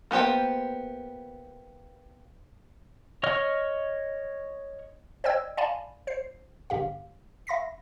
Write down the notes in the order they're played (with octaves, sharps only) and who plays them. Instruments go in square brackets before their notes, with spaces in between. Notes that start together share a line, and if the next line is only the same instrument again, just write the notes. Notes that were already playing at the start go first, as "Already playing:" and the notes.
[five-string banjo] A#3 B3 G4 C5 G5
[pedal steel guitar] C#5 D#5 C#6 F6
[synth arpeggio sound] C5 D5 D#5 G5 E6 G#6
D5 F5 G#5 A5 B5
C5 C7
G1 G2 G4 F5
E5 B5 A#6 B6